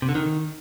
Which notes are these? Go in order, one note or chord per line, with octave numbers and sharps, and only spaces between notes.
C3
D3
D#3